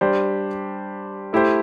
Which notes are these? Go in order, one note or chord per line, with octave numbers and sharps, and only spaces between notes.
G3 D4 G4 C5
A3 E4 G4 C5